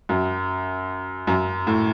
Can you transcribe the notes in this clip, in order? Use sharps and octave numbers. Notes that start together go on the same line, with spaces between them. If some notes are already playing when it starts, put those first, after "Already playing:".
F#2
F#2
A2